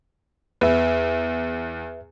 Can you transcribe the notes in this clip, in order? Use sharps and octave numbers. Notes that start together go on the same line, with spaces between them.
E2 B4 E5